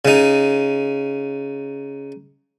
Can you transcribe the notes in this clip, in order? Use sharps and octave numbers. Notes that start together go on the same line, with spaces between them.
C#3 D#4